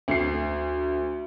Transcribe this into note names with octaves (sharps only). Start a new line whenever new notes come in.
D2 C7